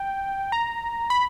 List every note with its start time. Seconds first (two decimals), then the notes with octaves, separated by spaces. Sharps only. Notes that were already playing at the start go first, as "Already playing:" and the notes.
Already playing: G5
0.52 A#5
1.10 B5